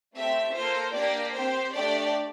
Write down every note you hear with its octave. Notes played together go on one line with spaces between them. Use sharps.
A3 C4 G4 E5
A#3 F4 A4 C5
A#3 D4 G4 D5
C4 G4 C5
A3 D4 G4 D5